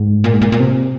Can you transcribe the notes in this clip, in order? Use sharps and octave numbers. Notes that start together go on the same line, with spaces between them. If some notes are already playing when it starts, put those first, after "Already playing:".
Already playing: G#2
A#2
G#2
A#2
A#2
C3